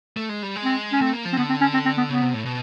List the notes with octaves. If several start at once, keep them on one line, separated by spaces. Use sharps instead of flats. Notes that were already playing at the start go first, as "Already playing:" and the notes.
A3
G#3
G3
G#3
C4
C#4
A3 C4
A#3
F3
C4
D3 B3
C4
C#4
C4
C4
B3
C#3 B3
C3
A2
B2